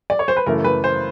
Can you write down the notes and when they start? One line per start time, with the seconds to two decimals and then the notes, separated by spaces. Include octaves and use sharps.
0.10 D5
0.19 C#5
0.28 C5
0.37 B4
0.46 F#2 C#3 E3 A3 A#4
0.64 B4
0.84 C5